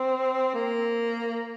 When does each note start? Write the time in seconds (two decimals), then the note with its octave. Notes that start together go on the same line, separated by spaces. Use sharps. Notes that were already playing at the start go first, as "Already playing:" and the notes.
Already playing: C4
0.55 A#3